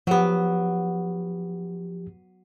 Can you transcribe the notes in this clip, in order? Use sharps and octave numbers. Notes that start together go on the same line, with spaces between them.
F3 F#3 B3 G4